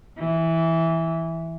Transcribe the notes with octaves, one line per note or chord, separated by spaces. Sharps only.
E3